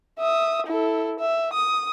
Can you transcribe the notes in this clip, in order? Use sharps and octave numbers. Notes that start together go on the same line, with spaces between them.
E5 D#6
E4 A4
E5
D#6